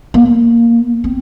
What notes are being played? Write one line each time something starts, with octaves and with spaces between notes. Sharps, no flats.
A#3
C4